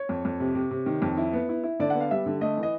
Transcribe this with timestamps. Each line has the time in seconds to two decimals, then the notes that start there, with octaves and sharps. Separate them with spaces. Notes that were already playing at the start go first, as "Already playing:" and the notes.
Already playing: C#5
0.09 F2
0.25 F2
0.40 C3
0.55 C3
0.71 C3
0.86 D#3
1.02 F2
1.17 E4
1.33 B3
1.49 E4
1.64 E4
1.80 D3 D5
1.90 B3 F#5
2.00 F5
2.11 G3 E5
2.26 D3
2.41 A3 D#5
2.57 E3
2.63 D#5